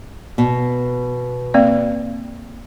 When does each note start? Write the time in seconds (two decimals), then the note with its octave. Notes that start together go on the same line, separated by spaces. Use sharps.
0.38 B2
1.54 A#3 C4 D5